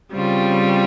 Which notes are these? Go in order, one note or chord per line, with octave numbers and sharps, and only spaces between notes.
C#3 G3 C4 F4